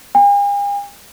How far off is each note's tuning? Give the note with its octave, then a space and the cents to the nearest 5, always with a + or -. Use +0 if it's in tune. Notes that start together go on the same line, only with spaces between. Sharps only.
G#5 -45